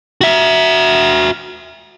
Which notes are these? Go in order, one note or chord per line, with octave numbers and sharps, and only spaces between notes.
F#4 E5